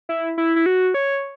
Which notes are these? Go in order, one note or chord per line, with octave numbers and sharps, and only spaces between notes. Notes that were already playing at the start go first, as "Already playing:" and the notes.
E4
E4
E4
F#4
C#5